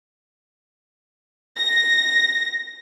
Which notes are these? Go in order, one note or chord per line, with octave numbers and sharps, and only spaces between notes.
A#6